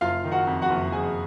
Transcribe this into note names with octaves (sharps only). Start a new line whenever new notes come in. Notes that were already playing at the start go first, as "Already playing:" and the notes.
F#1 F4 F5
D#3
F#4 F#5
F2
F#4 F#5
F#1
F#1 G#4 G#5